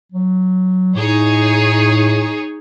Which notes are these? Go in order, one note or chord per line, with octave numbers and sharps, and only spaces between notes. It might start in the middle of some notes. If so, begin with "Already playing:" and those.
F#3
A2 D#4 G#4 C#5